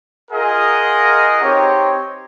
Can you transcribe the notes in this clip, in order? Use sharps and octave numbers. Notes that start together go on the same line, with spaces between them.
F4 G#4 A#4 D#5 F#5
C4 D#4 G4 C#5